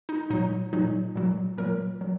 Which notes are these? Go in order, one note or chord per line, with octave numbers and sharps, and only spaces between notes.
D#4
A#2 F#3 D#4
A#2 F#3 D#4
A#2 F#3
A#2 F#3 A#4
F#3